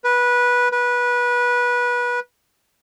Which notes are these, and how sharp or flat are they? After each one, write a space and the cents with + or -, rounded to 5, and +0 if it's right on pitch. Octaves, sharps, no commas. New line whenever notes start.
B4 -15
B4 -20